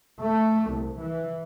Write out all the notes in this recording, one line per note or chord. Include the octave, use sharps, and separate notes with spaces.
A3
C2
E3